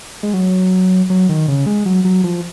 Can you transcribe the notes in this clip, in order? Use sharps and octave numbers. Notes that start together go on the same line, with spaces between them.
G#3
F#3
F#3
D#3
C#3
G#3
F#3
F#3
F3